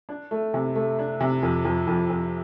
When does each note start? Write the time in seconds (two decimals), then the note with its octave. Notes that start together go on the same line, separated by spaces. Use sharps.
0.09 D4
0.31 A3
0.54 C3
0.75 A3
0.99 D4
1.21 C3
1.43 F2
1.65 F2
1.87 F2
2.10 F2